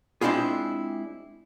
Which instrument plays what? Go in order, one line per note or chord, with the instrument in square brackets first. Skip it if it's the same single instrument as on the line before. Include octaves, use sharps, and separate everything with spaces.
[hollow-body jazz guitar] G#3 C4 D4 E4 F4 G#4